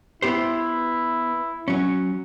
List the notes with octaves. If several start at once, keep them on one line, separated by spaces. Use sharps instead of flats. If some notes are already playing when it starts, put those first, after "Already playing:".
B3 E4 G4 C5
F#3 C#4